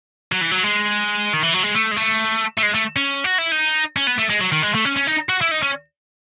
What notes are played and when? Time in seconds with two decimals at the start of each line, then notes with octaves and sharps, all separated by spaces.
0.32 F#3
0.41 E3
0.51 F#3
0.64 G#3
1.33 D#3
1.43 E3
1.54 F#3
1.63 G#3
1.75 A3
1.91 G#3
1.97 A3
2.58 A3
2.63 G#3
2.75 A3
2.96 C#4
3.24 F#4
3.38 E4
3.52 D#4
3.97 C#4
4.07 B3
4.18 A3
4.30 G#3
4.41 F#3
4.52 D#3
4.62 G#3
4.75 A3
4.85 C#4
4.97 C#4
5.07 D#4
5.29 F#4
5.41 E4
5.51 D#4
5.63 C#4